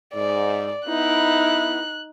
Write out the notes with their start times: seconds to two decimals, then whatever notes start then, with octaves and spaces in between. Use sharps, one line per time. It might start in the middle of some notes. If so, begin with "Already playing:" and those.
0.14 G#2 D5
0.88 B3 D#4 E4 F#6